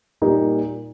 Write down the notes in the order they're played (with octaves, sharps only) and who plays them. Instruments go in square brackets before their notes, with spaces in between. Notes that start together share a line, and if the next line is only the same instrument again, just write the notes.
[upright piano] A#2 G3 A#3 D#4